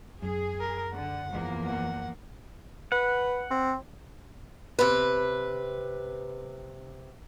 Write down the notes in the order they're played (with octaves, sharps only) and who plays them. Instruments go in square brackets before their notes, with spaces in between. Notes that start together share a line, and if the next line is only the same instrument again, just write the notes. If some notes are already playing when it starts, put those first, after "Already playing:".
[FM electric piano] F#2 [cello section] G#4
[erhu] A#4
[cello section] D3 [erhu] F#5
[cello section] E2 F3 A#3
[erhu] F#5
[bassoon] B4 [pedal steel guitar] F#5
[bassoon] C4
[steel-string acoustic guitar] C3 B4